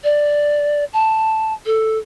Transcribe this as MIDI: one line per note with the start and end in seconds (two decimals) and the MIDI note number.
0.04 0.85 74
0.93 1.53 81
1.66 1.98 69